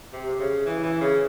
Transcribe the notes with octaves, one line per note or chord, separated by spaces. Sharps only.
C3
C3
C#3
E3
E3
C#3